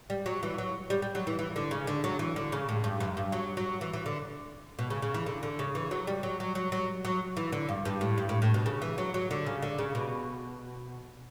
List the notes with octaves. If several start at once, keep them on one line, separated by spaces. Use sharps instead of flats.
G3
F#3
E3
F#3
G3
G3
F#3
E3
E3
D3
C#3
D3
F#3
E3
D3
C#3
A2
G2
F#2
G2
F#3
F#3
E3
E3
D3
B2
C#3
C#3
E3
D3
D3
C#3
E3
F#3
G3
F#3
F#3
F#3
F#3
F#3
E3
D3
G2
G2
A2
G2
A2
A2
B2
C#3
E3
F#3
F#3
D3
C#3
D3
C#3
B2